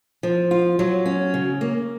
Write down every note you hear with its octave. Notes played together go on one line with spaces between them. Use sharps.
F3
F4
F#3
C#4
C#3
A#3